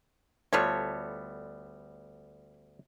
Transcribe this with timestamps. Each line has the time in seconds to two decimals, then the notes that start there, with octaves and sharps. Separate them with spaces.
0.53 D2 G3 B3 F4 A4 C#5